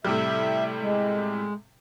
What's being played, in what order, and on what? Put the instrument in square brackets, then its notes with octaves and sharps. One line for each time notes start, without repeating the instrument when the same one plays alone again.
[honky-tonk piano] A2 C3 G3 [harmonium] E5
[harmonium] G#3